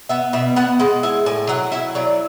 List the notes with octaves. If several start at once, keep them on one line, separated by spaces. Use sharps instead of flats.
B3 E5
B2 E5
B3 F#5
G#3 F#5
E4 G#5
A2 G#5
F#3 F#5
E4 E5
F#3 D5